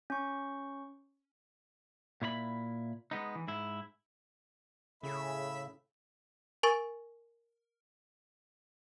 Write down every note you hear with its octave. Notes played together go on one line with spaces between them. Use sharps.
C#4 C#6
A#2 E4 C#5 B5
G#3 B3 D#4
E3
G#2 E4
A2 C#3 G#4 E5 B5
A#4 G#5 C#6 A6